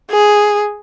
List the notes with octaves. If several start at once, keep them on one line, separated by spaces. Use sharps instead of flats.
G#4